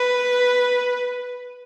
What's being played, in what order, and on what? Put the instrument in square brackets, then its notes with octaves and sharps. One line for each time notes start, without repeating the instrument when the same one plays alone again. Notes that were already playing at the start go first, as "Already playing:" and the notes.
Already playing: [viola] B4